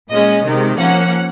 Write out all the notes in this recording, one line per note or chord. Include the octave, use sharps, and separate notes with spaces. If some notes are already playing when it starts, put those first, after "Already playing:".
A#2 G#3 C#4 D#5
C3 D#3 G#3
F3 A#3 C#4 F#5